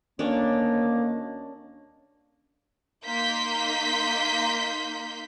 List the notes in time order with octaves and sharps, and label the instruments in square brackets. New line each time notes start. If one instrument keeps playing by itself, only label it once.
[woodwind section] D2 D#3 A#3 [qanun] C#4 D4
[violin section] A#3 D#4 C6 G6 B6